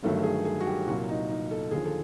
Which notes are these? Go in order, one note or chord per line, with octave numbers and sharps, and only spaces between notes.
G1 G2 D#3 F#3 A3 A4
G#4
G#4
F#4
G4
C2 A#2 F#3 F#4
D#4
D#4
A4
D#2 D3 F3 G#4
A4